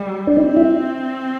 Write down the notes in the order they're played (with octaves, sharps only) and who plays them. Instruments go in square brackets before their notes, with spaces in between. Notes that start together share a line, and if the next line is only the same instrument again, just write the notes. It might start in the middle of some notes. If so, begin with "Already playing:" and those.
Already playing: [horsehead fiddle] G3
[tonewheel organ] D4
[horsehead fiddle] C4 [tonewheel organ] D#4
[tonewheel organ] E4